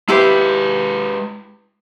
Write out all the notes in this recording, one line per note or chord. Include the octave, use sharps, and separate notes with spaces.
G#3 E4 G4 B4 C5